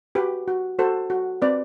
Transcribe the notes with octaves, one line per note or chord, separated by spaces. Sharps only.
F#4 G4 B4
F#4
F#4 A4 C5
F#4
C4 B4 D5